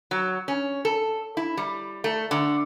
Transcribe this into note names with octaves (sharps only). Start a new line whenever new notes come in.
F#3
C#4
A4
E4
G3
A3
D3